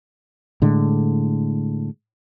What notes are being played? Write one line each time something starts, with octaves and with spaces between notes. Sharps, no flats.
A2 D3 G#3